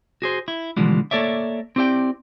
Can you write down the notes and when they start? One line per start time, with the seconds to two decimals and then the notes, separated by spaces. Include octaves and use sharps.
0.22 F#4 G#4 C5
0.48 E4
0.77 B2 D3 E3 F3 G3 G#3
1.11 A#3 A4 C#5 D5 E5
1.76 C4 E4 G4 D5 F5 G5